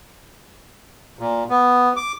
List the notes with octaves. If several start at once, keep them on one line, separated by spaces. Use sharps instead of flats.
A#2
B3
D6